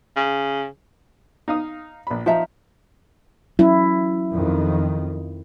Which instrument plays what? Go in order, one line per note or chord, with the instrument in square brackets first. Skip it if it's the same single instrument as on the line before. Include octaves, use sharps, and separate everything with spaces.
[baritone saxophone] C#3
[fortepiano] D#4 F5 D#6
A#1 B5
[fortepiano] F3 [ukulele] D#4 E5 A#5
[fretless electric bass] F#3 C#4 [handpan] E4
[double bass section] F2 D#3